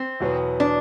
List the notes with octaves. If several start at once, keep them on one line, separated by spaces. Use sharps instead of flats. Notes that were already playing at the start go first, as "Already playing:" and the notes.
Already playing: C4
E2 B2 F#3 B3
D4